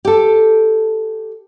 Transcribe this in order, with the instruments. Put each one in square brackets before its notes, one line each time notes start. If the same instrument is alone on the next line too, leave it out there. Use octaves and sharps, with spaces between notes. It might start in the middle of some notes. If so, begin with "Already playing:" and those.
[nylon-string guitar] G4 A4